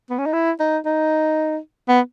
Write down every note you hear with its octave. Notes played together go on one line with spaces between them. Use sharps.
B3
C#4
D#4
E4
D#4
D#4
B3